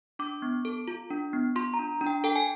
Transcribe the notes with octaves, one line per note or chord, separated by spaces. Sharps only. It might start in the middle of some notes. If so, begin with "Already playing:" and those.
D4 D6
B3
A4
F4
D4
B3
F4 C6
A#5
D4
D4
G5
A4 G5
G#5